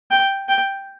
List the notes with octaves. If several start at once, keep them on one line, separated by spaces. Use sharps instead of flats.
G5
G5